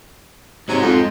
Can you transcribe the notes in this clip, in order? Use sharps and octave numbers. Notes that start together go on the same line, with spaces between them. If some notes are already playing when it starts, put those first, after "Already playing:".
G#2 C3 F#3 G#3
F2